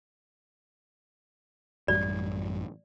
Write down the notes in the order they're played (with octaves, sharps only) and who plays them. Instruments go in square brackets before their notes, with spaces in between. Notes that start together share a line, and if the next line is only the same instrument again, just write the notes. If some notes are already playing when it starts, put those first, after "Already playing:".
[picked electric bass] A1 F#2 G3 [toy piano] D5